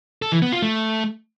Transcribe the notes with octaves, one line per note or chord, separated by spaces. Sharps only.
A4
E3
B3
F4
A3